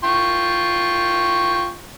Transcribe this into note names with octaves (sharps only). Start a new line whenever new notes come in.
F4 G5 C#6